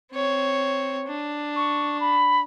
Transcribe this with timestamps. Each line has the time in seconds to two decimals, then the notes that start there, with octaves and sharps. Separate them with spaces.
0.12 C4 C#5
1.07 D4
1.56 C#6
2.00 B5